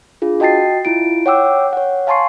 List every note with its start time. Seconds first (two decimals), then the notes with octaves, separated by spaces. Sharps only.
0.22 D4 F4 G#4
0.40 F#4 D#5 G5 A5 A6 C7
0.85 E4 F4 D7
1.26 C#5 F#5 G5 D6 E6
1.73 C#5 F#5
2.07 F5 G#5 A5 C6 C#6 C7